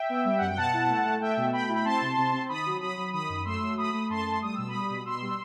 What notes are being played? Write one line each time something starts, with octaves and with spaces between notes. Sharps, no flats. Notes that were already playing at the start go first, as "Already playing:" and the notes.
Already playing: E5 G5
B3
G3
F#2 F#5
G5
B2 F#5 A5
E4
A3
A3
A3 E5 G5
B2
A3 G5 B5
E4
B5
C4 A5 C6
C3
C3
C4
D#3 B5 D#6
F#3
F#3 B5 D#6
F#3
D#3 B5 D#6
F#2
A3 C6 E6
F#3
A3 B5 D#6
A3
F#2 A5 C6
A3
G3 D#6
B2 E6
B5 D#6
G3
B2
B2 C6 E6
G3